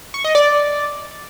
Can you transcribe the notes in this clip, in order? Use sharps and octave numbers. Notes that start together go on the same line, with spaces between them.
C#6
D#5
D5